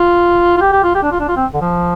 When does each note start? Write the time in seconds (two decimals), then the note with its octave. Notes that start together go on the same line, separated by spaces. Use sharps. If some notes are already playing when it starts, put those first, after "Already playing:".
Already playing: F4
0.57 F4
0.61 G4
0.72 G4
0.83 F4
0.95 G4
1.03 D4
1.12 F4
1.20 D4
1.28 F4
1.36 C4
1.54 D3
1.61 F3